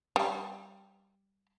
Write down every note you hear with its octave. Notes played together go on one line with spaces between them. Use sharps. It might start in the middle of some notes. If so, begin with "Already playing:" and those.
G3